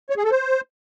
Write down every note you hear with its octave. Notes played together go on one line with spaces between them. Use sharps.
C#5
G#4
A4
C5